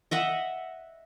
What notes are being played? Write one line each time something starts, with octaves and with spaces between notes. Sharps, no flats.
D#5 E5 F#5